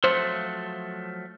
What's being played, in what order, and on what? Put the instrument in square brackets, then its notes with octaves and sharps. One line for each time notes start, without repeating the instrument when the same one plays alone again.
[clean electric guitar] F3 F#3 A3 [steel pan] C5